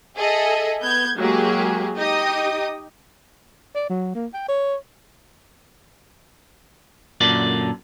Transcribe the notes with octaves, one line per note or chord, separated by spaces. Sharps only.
G#4 A4 D#5 E5
B3 G6 G#6
F#3 G#3 A#3 G4 G#4
D#4 G4 D#5 G5 D#6
D5
F#3
A#3
G5
C#5
F#2 A#2 D3 D5